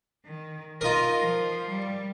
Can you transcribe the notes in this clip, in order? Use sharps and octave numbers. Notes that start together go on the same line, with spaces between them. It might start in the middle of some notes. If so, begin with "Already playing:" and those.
D#3
D#4 F4 A#4 D#5
F3
G3